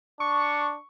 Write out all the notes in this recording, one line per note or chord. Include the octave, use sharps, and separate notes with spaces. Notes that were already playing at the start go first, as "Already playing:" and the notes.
D4 C#6